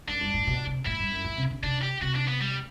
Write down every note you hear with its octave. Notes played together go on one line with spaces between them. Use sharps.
F#2 D4
G2
A2
B2
C3
A2 E4
G2
F#2
A2
C3
D3
C3 D4
G4
C3 F#4
D4
B3
G3